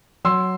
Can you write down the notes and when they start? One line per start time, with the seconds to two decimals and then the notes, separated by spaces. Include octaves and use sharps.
0.24 F#3 C6 E6